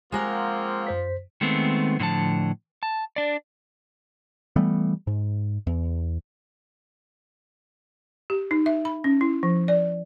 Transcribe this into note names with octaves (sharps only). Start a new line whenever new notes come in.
F3 G#3 A#3 C4 A#4 F#5
F#2 C5 B6
D#3 G#3 A3 B3 C4
A2 D3 F3 A5
A5
D4 D5
E3 G3 A3 B3
G#2
E2
G4
D#4
E5
B5
C#4
E4
F3
D5